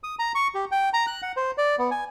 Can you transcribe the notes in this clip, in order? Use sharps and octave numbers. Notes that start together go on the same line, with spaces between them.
D#6
A#5
C#6
G4
G5
A#5
F#6
F#5
C5
D5
B3
G#5